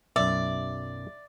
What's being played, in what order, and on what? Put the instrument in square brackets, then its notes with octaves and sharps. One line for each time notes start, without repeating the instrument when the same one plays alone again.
[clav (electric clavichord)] B1 F#2 [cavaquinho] D5 [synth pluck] E5